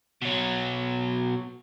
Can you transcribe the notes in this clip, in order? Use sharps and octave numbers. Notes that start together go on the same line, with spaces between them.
B2 F#3